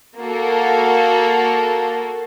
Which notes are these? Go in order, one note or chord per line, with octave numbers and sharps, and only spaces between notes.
A#3 F#4 A4